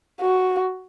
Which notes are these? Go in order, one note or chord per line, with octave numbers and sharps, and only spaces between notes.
F#4